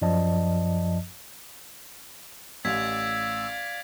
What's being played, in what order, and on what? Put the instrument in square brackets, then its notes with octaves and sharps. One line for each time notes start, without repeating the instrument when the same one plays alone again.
[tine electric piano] F#2 F3 D5 D#5 A5
[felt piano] A1 [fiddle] D5 F5 [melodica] E6 [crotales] G#6 B6